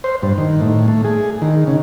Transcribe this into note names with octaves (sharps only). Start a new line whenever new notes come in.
C5
G2
D#3
A2
A3
G#4
D#3
C#3